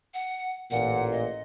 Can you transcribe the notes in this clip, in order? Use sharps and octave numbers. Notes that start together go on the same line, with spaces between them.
F#5
A1 A#2 F#5
D#5